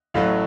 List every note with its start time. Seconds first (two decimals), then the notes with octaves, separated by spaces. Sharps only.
0.14 A1 A2 F#3 A3 F5